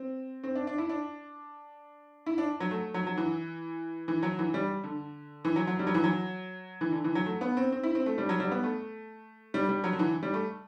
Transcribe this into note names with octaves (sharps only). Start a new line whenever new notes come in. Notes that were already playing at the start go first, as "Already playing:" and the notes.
Already playing: C4
C4
D4
D4
E4
D4
E4
D4
F#3
A3
F#3
F#3
E3
E3
F#3
E3
G3
D3
E3
F#3
F#3
G3
F#3
E3
F#3
E3
D3
E3
F#3
A3
B3
C4
C4
E4
C4
A3
G3
F#3
G3
B3
A3
G3
G3
F#3
D3
E3
G3
A3